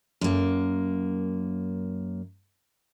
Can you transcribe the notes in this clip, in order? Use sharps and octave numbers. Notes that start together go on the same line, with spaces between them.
F#2 A#3